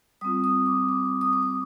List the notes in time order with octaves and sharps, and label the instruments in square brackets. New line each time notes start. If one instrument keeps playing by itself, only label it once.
[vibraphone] G3 C4 F4 D#6
D#6
D6
D6
D#6
D6
D#6